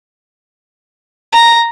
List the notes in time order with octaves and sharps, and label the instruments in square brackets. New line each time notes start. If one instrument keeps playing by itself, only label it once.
[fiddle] A#5